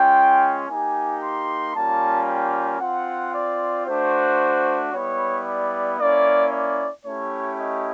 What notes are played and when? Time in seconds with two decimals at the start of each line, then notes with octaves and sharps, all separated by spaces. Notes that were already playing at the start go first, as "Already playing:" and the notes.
Already playing: G#3 C#4 F4 G5
0.68 A#3 D#4 G4 G#5
1.22 C6
1.75 G3 A#3 C#4 F4 A5
2.28 G5
2.81 C4 F4 F#5
3.34 D5
3.87 A3 D4 F#4 C5
4.93 G3 B3 E4 C#5
5.46 D5
5.99 A#3 C#4 E4 D5
6.52 D5
7.05 A3 C#4 E4 G4 C#5
7.59 D#5